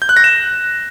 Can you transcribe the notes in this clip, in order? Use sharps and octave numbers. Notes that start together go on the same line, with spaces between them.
G6
F#6
A#6
E7